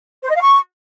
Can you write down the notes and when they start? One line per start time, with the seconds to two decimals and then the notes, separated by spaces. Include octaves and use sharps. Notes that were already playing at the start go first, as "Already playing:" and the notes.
0.24 C5
0.30 D#5
0.36 F5
0.41 C#6